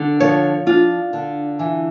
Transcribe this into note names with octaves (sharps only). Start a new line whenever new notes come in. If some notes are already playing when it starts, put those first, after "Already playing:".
Already playing: D3
F3 C#5
D4 F4
D3
E3